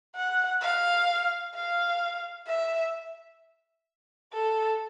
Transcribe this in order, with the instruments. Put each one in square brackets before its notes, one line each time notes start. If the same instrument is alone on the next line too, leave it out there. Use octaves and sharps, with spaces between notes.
[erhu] F#5
F5
F5
E5
A4